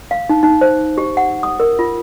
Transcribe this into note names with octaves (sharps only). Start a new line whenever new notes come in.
F5
D#4
D#4
C5
G4
F#5
D#6
A#4
F4